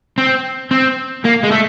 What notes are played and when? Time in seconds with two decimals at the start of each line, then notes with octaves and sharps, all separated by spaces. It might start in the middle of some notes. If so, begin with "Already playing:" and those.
0.18 C4
0.71 C4
1.24 A#3
1.43 G#3
1.51 A3